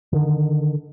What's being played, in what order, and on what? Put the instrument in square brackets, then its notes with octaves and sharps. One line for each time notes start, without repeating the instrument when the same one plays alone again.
[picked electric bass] D3 D#3